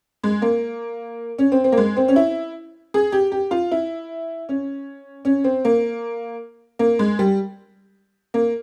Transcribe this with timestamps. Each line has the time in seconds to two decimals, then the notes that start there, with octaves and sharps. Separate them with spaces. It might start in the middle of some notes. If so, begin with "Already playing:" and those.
0.24 G#3
0.42 A#3
1.38 C#4
1.52 C4
1.64 C4
1.72 A#3
1.77 G#3
1.97 C4
2.08 C#4
2.16 E4
2.94 G#4
3.12 G4
3.32 G4
3.51 F4
3.71 E4
4.49 C#4
5.25 C#4
5.44 C4
5.65 A#3
6.79 A#3
6.99 G#3
7.19 G3
8.34 A#3